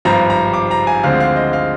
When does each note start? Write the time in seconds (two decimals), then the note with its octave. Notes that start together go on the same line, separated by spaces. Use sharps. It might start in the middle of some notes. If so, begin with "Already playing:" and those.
0.05 G#1 G2 F3 A#5
0.30 A#5
0.54 D6
0.71 A#5
0.87 G#5
1.03 D2 D3 F3 G#3 C4 F5
1.20 F5
1.36 D#5
1.53 F5